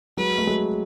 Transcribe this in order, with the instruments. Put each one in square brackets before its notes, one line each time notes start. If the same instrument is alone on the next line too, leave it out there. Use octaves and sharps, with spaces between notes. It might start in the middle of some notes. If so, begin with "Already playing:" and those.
[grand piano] F#3 G#3 [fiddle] B4
[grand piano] A3
F#3 G#3